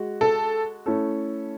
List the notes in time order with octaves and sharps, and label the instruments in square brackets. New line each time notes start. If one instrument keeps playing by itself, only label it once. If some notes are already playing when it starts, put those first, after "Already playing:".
Already playing: [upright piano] G#3 F#4
[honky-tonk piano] A4
[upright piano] A3 C#4 E4 A4